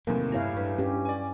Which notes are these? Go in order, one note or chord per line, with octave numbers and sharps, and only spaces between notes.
E2 A2 C3 D#3 F#3 A#3
G2 E4 C#5 F5
G2 B4
G2 C#4 G4
D5 G#5